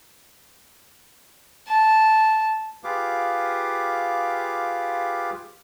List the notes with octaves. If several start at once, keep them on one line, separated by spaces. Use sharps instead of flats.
A5
F4 G4 G#4 B4 F5 D6